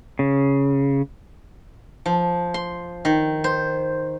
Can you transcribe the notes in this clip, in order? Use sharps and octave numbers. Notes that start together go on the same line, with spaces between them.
C#3
F3
C6
D#3
C5